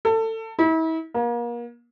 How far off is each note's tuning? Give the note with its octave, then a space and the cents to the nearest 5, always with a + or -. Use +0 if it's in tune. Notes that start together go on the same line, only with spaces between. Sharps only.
A4 +25
E4 -40
A#3 +35